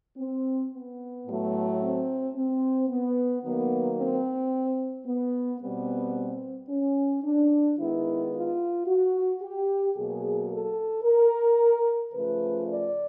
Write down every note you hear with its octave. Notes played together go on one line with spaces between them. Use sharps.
C4
B3
A2 F#3 A3
C4
C4
B3
D#3 F#3 A#3 B3
C4
B3
B2 G3 B3 C4
C#4
D4
D#3 G#3 B3 E4
F4
F#4
G4
B2 F#3 A#3 G#4
A4
A#4
C#3 F3 A3 B4
D5